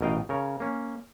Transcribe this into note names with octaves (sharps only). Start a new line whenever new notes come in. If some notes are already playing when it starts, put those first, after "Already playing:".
A1 B2 A#4 D#5 F5 G5
C#3 A#4 C#5
A#3 C#4